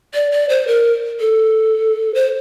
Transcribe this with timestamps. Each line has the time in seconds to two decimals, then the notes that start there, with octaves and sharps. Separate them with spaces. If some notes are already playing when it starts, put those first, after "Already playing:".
0.14 D5
0.32 D5
0.49 C5
0.67 A#4
1.20 A4
2.15 C5